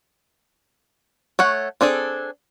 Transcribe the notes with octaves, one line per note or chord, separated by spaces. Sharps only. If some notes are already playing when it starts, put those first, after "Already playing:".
A3 C#5 F#5
C4 D4 G#4 A4